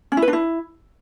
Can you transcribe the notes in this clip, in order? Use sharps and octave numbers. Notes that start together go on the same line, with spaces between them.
C#4
E4
B4
D4
E4